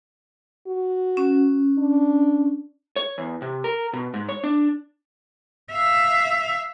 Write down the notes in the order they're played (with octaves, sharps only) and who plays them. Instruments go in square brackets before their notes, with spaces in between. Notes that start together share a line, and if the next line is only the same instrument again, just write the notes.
[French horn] F#4
[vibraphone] C#4
[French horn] D4
[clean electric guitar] C#5
E2
C3
A#4
B2
G#2
C#5
D4
[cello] E5 F5